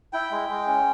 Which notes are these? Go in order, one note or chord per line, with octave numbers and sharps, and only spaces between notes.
E4 G5
G#3
G#3
C#4